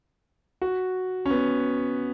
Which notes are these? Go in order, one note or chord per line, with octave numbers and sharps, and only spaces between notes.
F#4
C#4
B3